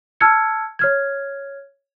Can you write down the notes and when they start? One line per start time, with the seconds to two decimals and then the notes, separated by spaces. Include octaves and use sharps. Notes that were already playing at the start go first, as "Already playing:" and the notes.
0.21 A5 E6 F6 G#6 C#7
0.79 C#5 F6 G#6